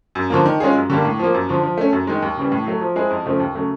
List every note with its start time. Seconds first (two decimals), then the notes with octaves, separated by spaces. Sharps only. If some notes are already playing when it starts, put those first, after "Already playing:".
0.15 F#2
0.30 D3 F3 A#3
0.46 D#3
0.60 G#3 C#4 F4 G#4
0.75 F#2
0.90 D3 G3 A#3
1.05 A2
1.19 F3 A#3
1.34 F#2
1.49 D3 F3
1.63 F3
1.77 A3 C#4
1.93 F#2
2.07 D#3 G#3
2.22 D#2
2.37 C#3 E3 G3
2.52 A2
2.66 F#3 A3
2.81 F3
2.96 G#3 C4 E4 G#4
3.10 F2
3.26 C#3 F3 A3
3.40 D#2
3.55 C#3 F#3 A3